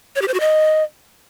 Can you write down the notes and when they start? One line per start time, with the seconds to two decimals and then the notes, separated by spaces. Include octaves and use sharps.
0.16 C#5
0.22 G4
0.28 C5
0.34 F#4
0.40 D#5